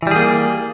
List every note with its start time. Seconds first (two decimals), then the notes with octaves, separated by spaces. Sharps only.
0.03 E3
0.07 G3
0.11 G#4
0.16 A#3